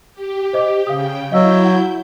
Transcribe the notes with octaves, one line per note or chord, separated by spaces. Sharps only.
G4
C5 D#5 D6
C#3 F5 G5 D#6
F#3 E4 D#5 F5 E6 G6
F#5